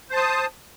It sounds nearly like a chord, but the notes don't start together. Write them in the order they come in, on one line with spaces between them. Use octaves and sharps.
C5 A5 D#6